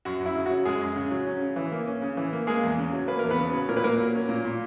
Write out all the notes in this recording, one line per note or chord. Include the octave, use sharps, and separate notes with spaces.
F#2 F#4
F#2
E4
C#3
F#3 F#4
F#2 G#3 G#4
F#2
C#3
F#3
C#4
C#3
E3
A#3
C#4
C#3
E3
A#3
G#3 A#3 G#4
E2
C#3
F#3
A#3 B4
E2 A#4
B3 B4
C#3
F#3
A#2 A#4
B4
A#2 A#3 A#4
F#3
C#4
A#2
A#2